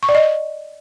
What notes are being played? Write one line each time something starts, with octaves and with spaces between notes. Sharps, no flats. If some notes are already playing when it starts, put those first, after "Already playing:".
C#6
D5
D#5